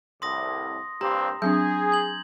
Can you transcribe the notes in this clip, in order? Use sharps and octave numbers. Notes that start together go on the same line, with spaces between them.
C2 A2 C6 D#6 A#6
G2 A#2 C4 G4 A#5 C6
F#3 C4 D4 G#4 G6
G#6 F#7